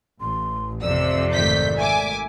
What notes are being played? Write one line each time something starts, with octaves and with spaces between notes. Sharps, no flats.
A1 C6
F2 C3 D5 E6
G#1 D#3 A3 G6 B6
E5 G#5 D6